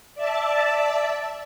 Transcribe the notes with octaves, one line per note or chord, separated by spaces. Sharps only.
D5 E5 A5